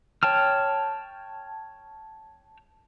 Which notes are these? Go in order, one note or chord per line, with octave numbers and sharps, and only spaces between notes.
C#5 G5 A5 F6